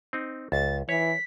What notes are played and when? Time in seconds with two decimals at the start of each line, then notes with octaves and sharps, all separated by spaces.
0.13 C4 D#4
0.52 C#2 A6
0.89 E3 C#5 B6